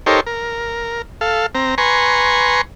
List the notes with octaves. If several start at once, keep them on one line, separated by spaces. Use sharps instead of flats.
D#4 G4 A4 A#4 C5 C#5
A#4
A4 F5
C4 A#5
B4 G#5 A#5 C6 C#6